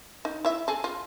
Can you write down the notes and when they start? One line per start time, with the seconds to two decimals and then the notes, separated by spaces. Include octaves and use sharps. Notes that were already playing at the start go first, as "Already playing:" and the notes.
0.25 D#4
0.45 E4 E5
0.68 G#4 A4
0.84 F4